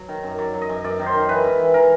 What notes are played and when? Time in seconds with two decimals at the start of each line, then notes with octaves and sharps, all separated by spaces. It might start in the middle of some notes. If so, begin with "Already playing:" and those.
Already playing: F#3
0.08 D#3
0.23 F#2
0.38 F#3 D5
0.54 F#3
0.61 D#5
0.69 F#2
0.84 F#2 D5
0.99 D#3
1.06 C5
1.14 D#3
1.29 E3 B4
1.44 G#2
1.59 E3
1.74 E3 A#4